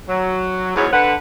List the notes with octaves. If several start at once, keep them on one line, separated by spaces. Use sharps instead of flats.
F#3
E2 G#2 F#3 B3 G#4 C#5
D3 B4 F#5